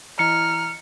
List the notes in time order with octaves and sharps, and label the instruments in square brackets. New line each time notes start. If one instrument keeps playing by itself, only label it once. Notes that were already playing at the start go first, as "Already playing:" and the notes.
[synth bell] E3 E4 D#5 [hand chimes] A#5 [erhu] F6 [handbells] C#7